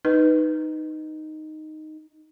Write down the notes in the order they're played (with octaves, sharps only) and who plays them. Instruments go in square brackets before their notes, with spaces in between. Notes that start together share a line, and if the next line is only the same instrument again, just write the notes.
[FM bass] D#4 [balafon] B4